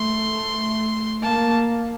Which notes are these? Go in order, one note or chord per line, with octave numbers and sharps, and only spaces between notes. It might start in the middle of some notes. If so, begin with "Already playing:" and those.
Already playing: A3 C6
A#3 A5